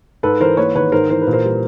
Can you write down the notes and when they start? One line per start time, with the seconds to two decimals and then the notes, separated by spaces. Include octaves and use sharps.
0.23 G#2 A4 B4
0.40 E3 A#4 C5
0.57 A#3 B4 C#5
0.75 D#3 B4 C#5
0.92 G#2 A#4 C5
1.10 E3 C5
1.22 B4
1.27 A#2
1.33 A#4 C5
1.44 G3